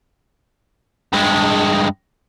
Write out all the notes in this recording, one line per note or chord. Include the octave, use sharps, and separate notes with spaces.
G2 G#3